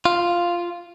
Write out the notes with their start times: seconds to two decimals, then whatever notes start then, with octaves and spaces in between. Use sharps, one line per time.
0.05 F4